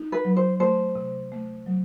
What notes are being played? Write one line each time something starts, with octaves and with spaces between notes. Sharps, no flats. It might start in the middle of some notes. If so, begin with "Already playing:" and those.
Already playing: D#4
B4
F#3
C5
A3 C5
C3
A3
F#3